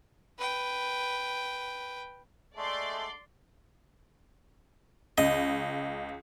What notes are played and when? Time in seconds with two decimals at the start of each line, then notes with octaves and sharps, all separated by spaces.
0.38 B4 G5
2.56 D3 G#3 A3 D5 C6
5.18 C#2 D#5